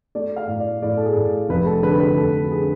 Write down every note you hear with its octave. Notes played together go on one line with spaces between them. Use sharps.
A3 D5
F5
A2
D5
A2 D5
A4
G#4
A2
F1 B4
A4
D3 B4
B4
F1 A4
D3 G#4